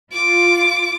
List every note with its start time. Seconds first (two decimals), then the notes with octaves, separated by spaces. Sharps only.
0.13 F4 D6